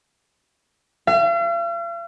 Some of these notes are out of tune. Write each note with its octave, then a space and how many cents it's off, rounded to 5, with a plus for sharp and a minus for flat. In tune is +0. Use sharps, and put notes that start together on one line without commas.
F5 -45